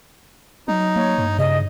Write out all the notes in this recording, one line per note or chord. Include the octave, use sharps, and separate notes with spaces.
F#3 D#4
A#3 C#5
G2
C#3 D#5